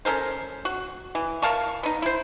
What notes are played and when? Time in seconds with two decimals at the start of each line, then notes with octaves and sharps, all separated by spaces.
0.05 C#4 A4 A#4 C5
0.65 F#4
1.15 E3
1.42 A#4 F5 A5 C#6
1.83 B3 D#4
2.02 E4 C5